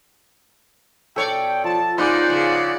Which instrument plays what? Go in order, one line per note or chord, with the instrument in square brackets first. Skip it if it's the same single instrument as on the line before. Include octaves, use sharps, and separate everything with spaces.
[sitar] B2 C#5 D5 [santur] A4 [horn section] G5
[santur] F3 [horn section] A5
[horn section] A#3 C#4 C5 [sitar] D#4 [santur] G#4 B4 [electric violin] D5 F#5
[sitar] C#3